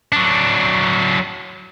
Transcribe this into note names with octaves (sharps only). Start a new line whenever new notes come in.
F#3 D4